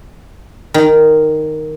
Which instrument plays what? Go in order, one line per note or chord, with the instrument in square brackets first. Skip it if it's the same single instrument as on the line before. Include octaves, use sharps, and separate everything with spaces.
[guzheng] D#3